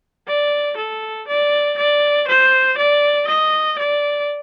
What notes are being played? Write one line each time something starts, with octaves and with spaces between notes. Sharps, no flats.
D5
A4
D5
D5
C5
D5
D#5
D5